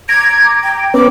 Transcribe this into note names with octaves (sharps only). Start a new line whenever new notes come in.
A#5 D6 G#6
G5
B3 C#4 B4 D6